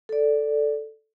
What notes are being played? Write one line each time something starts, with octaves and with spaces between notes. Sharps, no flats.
A4 D5